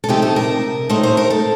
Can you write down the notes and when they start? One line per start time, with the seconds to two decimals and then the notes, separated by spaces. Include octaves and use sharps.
0.04 A4
0.08 C3 F3 A3 D#4 G4
0.22 A4
0.36 A#4
0.89 A2 A3 D#4 C5
1.03 C5
1.17 A#4
1.30 A4